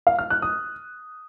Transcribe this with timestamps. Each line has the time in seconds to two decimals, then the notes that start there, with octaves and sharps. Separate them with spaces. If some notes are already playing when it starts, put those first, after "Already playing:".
0.07 F5
0.19 F6
0.30 F#6
0.42 D#6